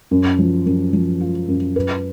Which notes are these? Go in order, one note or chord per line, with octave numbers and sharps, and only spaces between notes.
F#2
F3
F#2
F3
F4
F#2
B4